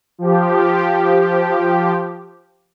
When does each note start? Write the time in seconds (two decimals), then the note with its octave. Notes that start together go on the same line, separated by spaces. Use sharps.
0.18 F3 G4